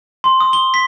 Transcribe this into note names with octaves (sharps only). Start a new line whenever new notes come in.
C6
D#6
G7
B6